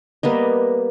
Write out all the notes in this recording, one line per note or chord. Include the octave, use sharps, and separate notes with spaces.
G3 A#3 B3 D#5